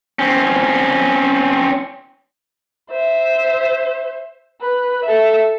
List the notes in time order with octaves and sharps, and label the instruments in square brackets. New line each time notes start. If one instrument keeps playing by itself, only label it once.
[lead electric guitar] C4 C#4
[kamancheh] C5 E5
B4
A4 E5